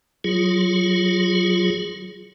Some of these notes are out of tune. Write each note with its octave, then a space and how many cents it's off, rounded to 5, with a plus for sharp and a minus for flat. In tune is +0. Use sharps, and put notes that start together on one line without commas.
F#3 +5 F4 +0 G#4 +0